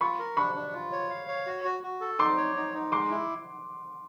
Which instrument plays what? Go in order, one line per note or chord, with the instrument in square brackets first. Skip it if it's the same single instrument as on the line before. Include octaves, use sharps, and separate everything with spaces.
[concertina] F4 [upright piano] B5 C#6
[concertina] A#4
[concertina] D4 [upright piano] B5 C#6
[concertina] D4
F4
C#5
F5
C#5
F#4
F#4
F#4
A4
[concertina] D#4 [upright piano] C6 D6
[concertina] C#5
D#4
D#4
[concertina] G#3 [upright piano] C6 D6
[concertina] E4